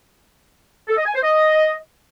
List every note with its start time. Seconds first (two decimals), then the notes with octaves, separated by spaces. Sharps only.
0.88 A4
0.97 D#5
1.06 G#5
1.14 C5
1.23 D#5